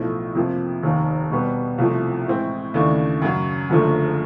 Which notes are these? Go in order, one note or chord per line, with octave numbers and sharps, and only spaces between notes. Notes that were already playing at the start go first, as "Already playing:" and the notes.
Already playing: B1 A2 F3 A3
F2 C3 F3 A#3
F1 D#2 D#3
B2 G3 B3
C2 C3 F3 A3
A2 E3 G#3 C4 E4
D#2 C#3 E3 A3 D4
F#2 C#3 F#3
F#1 F#2 D3 F3 A3